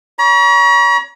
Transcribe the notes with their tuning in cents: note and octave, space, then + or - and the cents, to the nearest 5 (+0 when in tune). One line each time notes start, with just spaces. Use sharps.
C#5 +25 A#5 +45